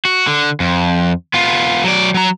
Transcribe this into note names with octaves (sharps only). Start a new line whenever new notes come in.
F#4
D3
F2
B3 F4
F#3 D5
F#3 A#5